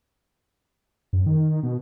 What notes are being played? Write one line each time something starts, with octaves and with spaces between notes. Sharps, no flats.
F#2
D#3
B2